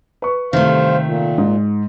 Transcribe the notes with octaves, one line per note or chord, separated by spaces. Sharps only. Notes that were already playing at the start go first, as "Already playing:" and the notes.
B4 C#6
G2 C3 D#3 A3 C5 F5
A#2
G#2